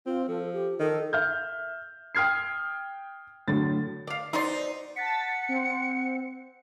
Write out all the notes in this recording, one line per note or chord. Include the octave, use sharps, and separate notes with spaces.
C4 F4
F3 A4
G4
D#3 A4
E5 F6 G6
G5 D#6 F6 G#6 C7
A2 D3 F#3 A6
D5 F5
B2 D#4 C5 D5 C6 A6
F#5 A5 A6 B6 C#7
C4